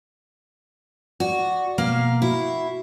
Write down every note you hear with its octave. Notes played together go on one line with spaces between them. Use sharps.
F#4 D5
B2 A#3 F5
E4 F#4